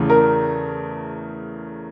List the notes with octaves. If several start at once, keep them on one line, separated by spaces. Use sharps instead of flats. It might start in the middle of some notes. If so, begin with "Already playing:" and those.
Already playing: E2 C#3 E3 A3
A#4